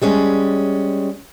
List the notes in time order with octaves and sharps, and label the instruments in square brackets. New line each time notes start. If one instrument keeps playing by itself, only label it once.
[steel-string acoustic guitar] G3 G#3 C#4